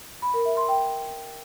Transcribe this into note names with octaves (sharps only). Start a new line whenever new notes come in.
B5
A#4
E5
C6
G5